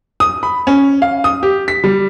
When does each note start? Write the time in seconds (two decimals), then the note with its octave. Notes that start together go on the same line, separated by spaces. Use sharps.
0.20 D#6
0.43 B5
0.67 C#4
1.02 F5
1.24 D#6
1.43 G4
1.68 B6
1.84 G3